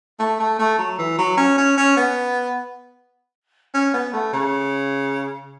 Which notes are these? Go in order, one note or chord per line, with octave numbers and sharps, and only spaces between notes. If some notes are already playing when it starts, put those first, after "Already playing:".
A3
A3
A3
F#3
E3
F#3
C#4
C#4
C#4
B3
C#4
B3
A3
C#3